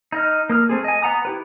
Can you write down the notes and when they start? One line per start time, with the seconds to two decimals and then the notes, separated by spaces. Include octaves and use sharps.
0.12 D#4 D#5 F6
0.50 A#3 D#6 F6
0.69 A3 C4 G#4
0.84 D#5 G#5
1.03 B3 F#5 A#5 D#6
1.25 E4 G4 B4